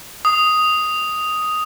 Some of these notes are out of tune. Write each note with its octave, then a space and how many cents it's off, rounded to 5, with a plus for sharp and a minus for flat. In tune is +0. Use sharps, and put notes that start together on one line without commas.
D#6 +0